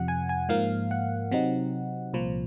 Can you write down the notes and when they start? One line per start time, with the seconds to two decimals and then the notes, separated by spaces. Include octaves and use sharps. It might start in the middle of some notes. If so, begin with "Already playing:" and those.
Already playing: F2 C3 F3 F#5
0.08 G#5
0.29 G#5
0.49 G#2 F3 A#3 F5
0.91 F#5
1.31 C3 F#3 C4 D#4
2.13 C2 A#2 F3